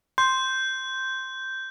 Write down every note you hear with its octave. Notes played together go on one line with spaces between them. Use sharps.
C6 G6